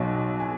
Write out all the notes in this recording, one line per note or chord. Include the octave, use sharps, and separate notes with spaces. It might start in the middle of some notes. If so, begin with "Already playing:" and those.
Already playing: B1 B2 F#3
G#5